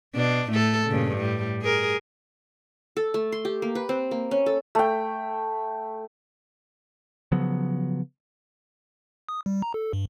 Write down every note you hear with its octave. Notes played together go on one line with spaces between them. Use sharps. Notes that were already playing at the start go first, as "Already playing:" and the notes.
B2 D4
A2 A3 A4
G2 A#2 C#3
A2 G3
G#4 A#4
A4
A3
C6
G4
A#3
B4
C4
A#3
C#4
A4
A3 G5
C#3 F3 F#3 B3
D#6
G3
A#5
A4
G2